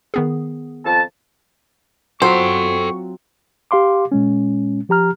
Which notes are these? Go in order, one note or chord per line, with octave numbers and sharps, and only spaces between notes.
D#3 B3 G#4
F2 A5
F#3 C4 F4 A4 C5 G5 C#6
G4 F5 C6 D6
A#2 G#3 C#4
F3 G4 A#5 F6